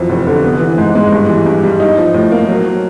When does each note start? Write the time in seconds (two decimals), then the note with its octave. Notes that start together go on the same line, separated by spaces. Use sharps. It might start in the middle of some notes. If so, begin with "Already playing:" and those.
Already playing: F2 E3 F#3
0.09 F1
0.27 D3
0.44 B3
0.60 E3
0.78 G#2
0.95 G#3
1.13 G2
1.29 E3
1.46 G2
1.63 G3
1.80 D#4
1.97 F3
2.14 A2
2.32 A#3
2.48 F#3